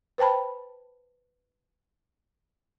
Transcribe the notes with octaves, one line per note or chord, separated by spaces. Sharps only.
B4 C5 G5 A5 B5